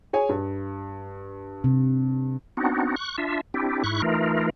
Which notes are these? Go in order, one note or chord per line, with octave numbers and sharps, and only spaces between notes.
G#4 C#5 G#5
G2
C3
B3 C4 D4 D#4 F#4
C#6 F#6
D4 F4 E5
C4 D4 E4 G4
G#2 E4 C#6 F#6
E3 A3 D#4 F4 A#4